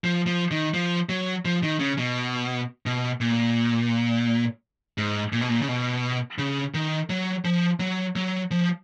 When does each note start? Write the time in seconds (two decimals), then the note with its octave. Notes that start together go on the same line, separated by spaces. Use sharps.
0.04 F3
0.26 F3
0.51 D#3
0.74 F3
1.09 F#3
1.45 F3
1.63 D#3
1.79 C#3
1.98 B2
2.86 B2
3.20 A#2
4.98 G#2
5.33 A#2
5.41 B2
5.49 A#2
5.62 C#3
5.68 B2
6.38 C#3
6.74 D#3
7.10 F#3
7.45 F3
7.79 F#3
8.16 F#3
8.51 F3